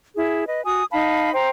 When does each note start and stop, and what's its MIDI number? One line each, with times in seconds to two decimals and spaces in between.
0.15 0.46 64
0.15 0.46 68
0.47 0.63 71
0.47 0.63 75
0.65 0.83 66
0.65 0.83 80
0.65 0.83 87
0.91 1.30 63
0.91 1.30 77
0.91 1.30 81
0.91 1.30 83
1.33 1.50 72
1.33 1.50 79
1.33 1.50 82